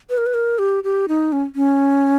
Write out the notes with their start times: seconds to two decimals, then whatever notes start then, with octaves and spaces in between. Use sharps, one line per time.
0.10 B4
0.18 A#4
0.26 B4
0.34 A#4
0.59 G4
0.84 G4
1.08 D#4
1.32 C#4
1.56 C#4